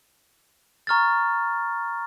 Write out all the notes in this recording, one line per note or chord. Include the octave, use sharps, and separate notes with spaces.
A#5 C#6 F6 A6